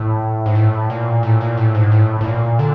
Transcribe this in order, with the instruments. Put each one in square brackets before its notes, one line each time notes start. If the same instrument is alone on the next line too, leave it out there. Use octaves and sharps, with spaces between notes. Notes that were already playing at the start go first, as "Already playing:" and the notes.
Already playing: [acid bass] A2
G#2
A2
A#2
A2
A#2
A2
G#2
A2
A2
A#2
D3